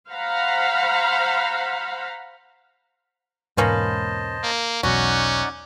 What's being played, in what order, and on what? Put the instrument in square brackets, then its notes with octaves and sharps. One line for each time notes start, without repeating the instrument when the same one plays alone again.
[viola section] C5 F5 F#5 A#5 B5
[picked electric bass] E1 G#2 [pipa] A#3 C#4 B4 [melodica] C5 D#5 A5
[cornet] A#3
[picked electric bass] E1 B1 F#3 [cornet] C#4 [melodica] D#4 D5 F#5 [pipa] F#4